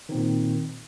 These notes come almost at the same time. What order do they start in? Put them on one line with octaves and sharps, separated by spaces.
D#3 C4 A#2